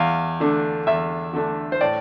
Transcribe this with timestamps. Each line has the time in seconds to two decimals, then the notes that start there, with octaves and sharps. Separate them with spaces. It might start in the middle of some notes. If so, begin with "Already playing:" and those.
Already playing: E2 F5
0.40 D3 A3 D4
0.87 E2 E5
1.33 D3 A3 D4
1.72 C5
1.81 A2 D5